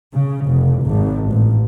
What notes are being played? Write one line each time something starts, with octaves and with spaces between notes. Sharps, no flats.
C#3
F1
G#1
A1